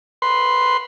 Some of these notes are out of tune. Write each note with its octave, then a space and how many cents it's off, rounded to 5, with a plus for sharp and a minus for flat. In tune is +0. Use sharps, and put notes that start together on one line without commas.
B4 +0 C6 +0